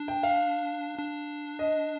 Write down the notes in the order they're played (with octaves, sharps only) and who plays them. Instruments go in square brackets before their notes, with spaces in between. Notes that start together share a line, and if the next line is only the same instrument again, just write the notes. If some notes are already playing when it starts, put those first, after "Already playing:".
Already playing: [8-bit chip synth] D4
[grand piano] G5
F5
[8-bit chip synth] D4
[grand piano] D#5